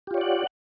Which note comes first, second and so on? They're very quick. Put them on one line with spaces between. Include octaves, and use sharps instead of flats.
G4 F4 C#5 D5 F#5